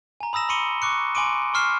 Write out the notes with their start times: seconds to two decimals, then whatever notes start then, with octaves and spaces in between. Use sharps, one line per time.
0.21 G#5 A#5
0.33 B5 D#6 E6 A#6 E7
0.49 B5 C6 D6 C#7 D#7 G7
0.82 C#6 D6 F#6 C#7
1.15 G#5 B5 C6 D6 D7 D#7
1.54 C6 C#6 F6 C7 E7